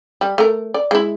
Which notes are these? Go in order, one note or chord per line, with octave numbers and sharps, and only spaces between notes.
G3
A3 A#4
D5
G#3 E4